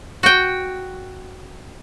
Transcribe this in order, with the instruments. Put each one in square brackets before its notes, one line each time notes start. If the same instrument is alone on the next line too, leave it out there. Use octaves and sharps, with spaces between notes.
[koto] F#4 G5